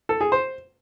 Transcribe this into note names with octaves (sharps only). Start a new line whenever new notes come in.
A4
G#4
C5